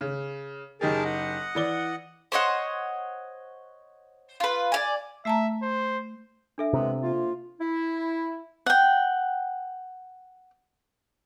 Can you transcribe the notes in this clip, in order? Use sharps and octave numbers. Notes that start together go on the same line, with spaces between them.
C#3
F#1 D#4 G4 G#4 A#4 A5
D#5 F#5
E3 D5 G7
C5 C#5 D#5 F#5
F4 B4
D5 F5 G#5
A3 E5 A5 A#5
C5
D4 A4 E5
C3 E3 G#3 B3
F3 A#3 F4
E4
F#5 G5